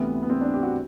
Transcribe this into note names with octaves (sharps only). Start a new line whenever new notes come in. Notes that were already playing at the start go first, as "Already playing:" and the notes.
Already playing: D2 C3 E3 B3
B3
C4
D4
G4
F#4